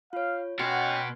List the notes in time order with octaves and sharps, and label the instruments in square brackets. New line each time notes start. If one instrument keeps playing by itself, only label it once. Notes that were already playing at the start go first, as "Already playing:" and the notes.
[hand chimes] F4 C#5 [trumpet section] F5
[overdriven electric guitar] B2 F#4 [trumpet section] C#4 F#5 G5 [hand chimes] C6 F6 G#6